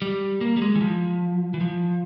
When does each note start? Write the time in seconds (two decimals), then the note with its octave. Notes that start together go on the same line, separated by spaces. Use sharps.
0.02 G3
0.41 A#3
0.57 G3
0.62 G#3
0.75 E3
0.81 F3
1.54 E3
1.61 F3